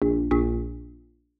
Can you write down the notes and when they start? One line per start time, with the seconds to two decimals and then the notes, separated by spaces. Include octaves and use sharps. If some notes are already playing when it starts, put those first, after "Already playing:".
0.02 A#1
0.31 A#1